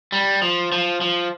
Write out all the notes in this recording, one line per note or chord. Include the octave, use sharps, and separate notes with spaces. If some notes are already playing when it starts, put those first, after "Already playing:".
G3
F3
F3
F3